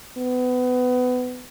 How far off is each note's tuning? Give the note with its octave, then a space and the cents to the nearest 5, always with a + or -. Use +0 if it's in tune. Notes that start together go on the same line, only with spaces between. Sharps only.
B3 +25